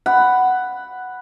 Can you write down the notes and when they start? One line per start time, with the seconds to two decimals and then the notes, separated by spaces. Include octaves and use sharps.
0.06 F#5 B5